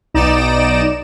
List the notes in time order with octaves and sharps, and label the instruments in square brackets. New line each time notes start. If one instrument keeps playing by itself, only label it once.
[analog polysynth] B1 D#4 D5 A#6 D7 E7